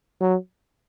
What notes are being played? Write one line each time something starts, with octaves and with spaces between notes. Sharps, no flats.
F#3